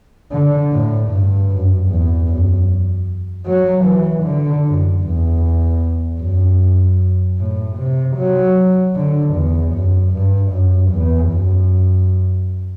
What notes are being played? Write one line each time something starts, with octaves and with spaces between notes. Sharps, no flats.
D3
A2
G2
F#2
E2
F#2
F#3
E3
D3
F#2
E2
F#2
A2
C3
F#3
D3
E2
F#2
G2
F#2
E2
F#2